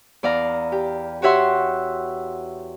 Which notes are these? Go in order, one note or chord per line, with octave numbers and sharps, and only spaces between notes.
E2 D5 F5 A#5
G4
F#4 G4 C#5 E5 F#5 C6